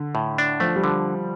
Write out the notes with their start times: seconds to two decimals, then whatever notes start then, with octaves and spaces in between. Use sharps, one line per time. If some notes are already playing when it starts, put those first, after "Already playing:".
Already playing: D3
0.15 A2
0.38 D4
0.60 F3 A3
0.76 G3
0.84 D3